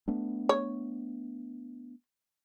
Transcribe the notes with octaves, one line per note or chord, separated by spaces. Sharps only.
A3 B3 D4
C#5